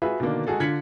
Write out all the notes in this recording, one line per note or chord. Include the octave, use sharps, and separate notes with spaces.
F4 F#4 G#4 B4 E5
B2 D3 D#3 A#3 D4
G#3 F#4 G#4 A4
D3 F4 G#6 B6 C#7 F#7